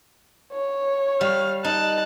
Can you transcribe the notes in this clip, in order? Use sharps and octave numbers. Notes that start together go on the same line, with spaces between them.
C#5
G3 F5
D#4 A5 F#6